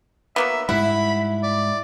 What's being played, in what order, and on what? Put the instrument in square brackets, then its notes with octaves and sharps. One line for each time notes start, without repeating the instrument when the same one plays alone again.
[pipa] F#3 A#3 B3 [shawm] E5
[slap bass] G#2 G3 [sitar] E4 [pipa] F#5 [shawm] B5
[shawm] D5